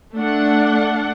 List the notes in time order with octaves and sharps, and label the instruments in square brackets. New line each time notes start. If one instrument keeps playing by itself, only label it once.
[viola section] A3 D4 F#5